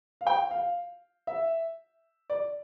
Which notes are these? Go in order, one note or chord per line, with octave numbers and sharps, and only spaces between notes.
F5
G5
F5
E5
D5